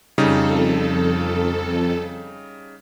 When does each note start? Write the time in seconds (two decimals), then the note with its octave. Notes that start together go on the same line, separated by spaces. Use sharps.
0.18 F2 C#3 G3 D#4 A4